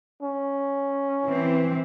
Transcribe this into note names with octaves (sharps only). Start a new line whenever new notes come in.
C#4
E3 C4